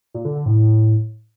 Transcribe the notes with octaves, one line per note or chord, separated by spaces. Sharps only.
A#2
D3
D3
A2